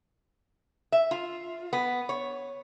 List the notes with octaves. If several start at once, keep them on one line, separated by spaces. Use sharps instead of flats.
E5
F4
B3
C#5